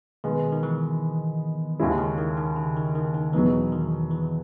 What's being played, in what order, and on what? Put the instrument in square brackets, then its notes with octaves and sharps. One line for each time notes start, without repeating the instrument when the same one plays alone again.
[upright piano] B2 G#3 B3 [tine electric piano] D#3
[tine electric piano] D#3
E3
[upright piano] D#2 C#3 G#3 C#4 E4
[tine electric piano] D#3
D#3
D#3
C#3
D#3
D#3
D#3
[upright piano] E2 B2 F#3 B3 D#4 [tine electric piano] E3
[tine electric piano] D#3
E3